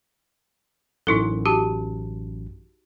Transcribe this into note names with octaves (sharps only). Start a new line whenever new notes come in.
A1 F#2 D#4 E4 A4
F#4 G4 A5